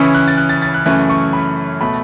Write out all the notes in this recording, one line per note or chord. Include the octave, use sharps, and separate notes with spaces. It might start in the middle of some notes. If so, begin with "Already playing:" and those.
Already playing: C#3 E3 C#4 E4
F#6
A6
F#6
A6
A6
F#6
F#2 C#3 E3 A3 C#4 F#6
C#6
B5
B2 A3 B5